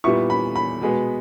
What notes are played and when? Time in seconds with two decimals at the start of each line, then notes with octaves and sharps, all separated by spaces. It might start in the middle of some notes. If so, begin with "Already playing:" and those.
0.04 A#2 G3 B3 E4 C#6
0.30 B5
0.56 B5
0.81 B2 G#3 B3